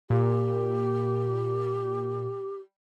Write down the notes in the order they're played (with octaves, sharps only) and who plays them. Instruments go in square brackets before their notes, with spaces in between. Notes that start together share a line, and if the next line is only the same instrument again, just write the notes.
[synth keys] A#2 [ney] G4